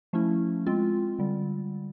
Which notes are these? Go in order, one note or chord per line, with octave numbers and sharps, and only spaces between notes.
F3 A3 C#4 E4
G#3 C4 F4
D3 G3